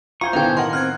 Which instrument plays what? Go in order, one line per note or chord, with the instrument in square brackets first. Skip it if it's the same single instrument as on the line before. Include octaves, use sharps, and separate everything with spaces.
[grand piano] F4 F5 G7 [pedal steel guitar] C5 G#5 C#6 [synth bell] A#5
[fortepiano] B1 D3 [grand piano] A2 D#3 B3 [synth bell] F5 G5
[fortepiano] A#4 D#5 F#5 [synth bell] C6
[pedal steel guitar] C4 [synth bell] F6 F#6 G#6